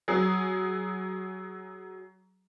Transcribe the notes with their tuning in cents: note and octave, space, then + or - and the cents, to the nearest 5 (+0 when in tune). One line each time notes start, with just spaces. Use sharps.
F#3 +20 G#4 +0